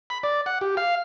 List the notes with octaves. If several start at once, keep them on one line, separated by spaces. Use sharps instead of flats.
B5
D5
F#5
G4
F5